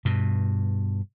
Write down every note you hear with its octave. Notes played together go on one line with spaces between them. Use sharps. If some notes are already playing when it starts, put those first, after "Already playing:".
G2 B2